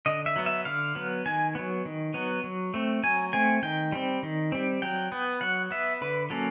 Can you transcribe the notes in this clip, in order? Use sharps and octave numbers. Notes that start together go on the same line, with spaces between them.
D3 D#5
E5
F#3 B3
E5
D3 F5
F#3 B3
D#3 G#5
F#3 B3
D#3
F#3 B3
F#3
A3 C4
F#3 G#5
A3 C4 G#5
D#3 G5
G3 C4
D#3
G3 C4
F#3 G5
B3
F#3 F#5
B3 E5
D3 B4
F#3 A#3 C#4 A4